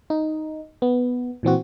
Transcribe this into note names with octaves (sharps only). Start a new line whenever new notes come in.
D#4
B3
A#2 E3 C4 F#4